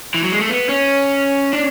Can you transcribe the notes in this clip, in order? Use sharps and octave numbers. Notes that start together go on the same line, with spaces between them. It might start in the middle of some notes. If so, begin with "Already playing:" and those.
E3
F#3
G#3
A3
B3
C#4
D4